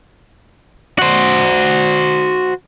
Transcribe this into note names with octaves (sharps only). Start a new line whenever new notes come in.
F#4 C5